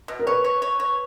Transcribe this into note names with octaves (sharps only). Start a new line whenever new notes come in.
B2
A#4
B4 C#5
C#5
C#5
C#5